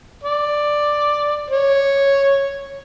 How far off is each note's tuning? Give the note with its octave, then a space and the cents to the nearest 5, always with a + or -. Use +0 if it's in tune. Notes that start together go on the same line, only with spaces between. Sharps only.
D5 +5
C#5 -5